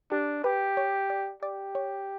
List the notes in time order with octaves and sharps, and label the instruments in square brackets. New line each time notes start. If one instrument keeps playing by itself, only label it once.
[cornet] D4 [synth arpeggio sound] G4
[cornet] G4 [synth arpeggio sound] B4
[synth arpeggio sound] C#5
D5
[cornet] G4 [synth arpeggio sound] D5
[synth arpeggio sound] C#5